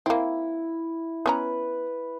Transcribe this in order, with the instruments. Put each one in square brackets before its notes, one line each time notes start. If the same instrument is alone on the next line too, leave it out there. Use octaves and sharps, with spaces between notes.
[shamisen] A#3 C4 [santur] E4
[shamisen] B3 C#4 A#5 [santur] B4